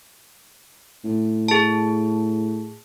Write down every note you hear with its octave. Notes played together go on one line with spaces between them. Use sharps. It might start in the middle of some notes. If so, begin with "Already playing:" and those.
A2
G#4 A5